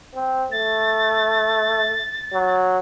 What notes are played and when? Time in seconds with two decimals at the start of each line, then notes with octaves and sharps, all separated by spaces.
0.15 C4
0.52 A3 A6
2.34 F#3